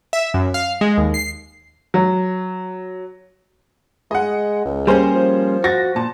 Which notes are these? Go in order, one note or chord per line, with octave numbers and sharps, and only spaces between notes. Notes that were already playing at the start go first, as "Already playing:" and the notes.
E5
F#2
F5
G#3
D#2
C7
F#3
G#3 D#5 F#5
C#2
G3 A#3 C#4 G#4 C5
F3
F#4 A6 A#6
A#2 A5